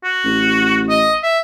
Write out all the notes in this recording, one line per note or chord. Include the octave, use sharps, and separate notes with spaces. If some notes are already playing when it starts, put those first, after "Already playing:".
F#4
A1
D#5
E5